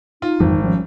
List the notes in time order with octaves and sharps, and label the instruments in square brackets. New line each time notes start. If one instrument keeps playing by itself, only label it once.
[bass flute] D#4 [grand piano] F4
[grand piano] G#1 [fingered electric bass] F2 E3 F#3
[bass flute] F3 [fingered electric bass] G3 C#4